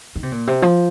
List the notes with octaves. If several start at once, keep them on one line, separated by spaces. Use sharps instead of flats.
D#3
C3
A#2
C3
F3